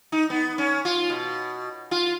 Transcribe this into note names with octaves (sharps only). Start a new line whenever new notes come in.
D#4
B3
C#4
F4
B2
F4